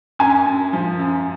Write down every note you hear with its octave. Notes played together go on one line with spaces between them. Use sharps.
F#2 G#5
F#2
F3
F#2